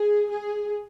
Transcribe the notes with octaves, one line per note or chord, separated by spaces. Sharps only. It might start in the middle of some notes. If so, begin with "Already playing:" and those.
Already playing: G#4
G#4